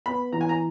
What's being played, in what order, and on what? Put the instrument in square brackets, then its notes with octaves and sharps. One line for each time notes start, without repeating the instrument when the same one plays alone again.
[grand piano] B3 [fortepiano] B5
[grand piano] E3 [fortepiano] A#5
[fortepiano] G#5
A#5